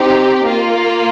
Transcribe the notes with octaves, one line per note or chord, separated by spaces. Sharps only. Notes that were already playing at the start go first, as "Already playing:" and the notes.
Already playing: C4 D#4 G4
A#3 F4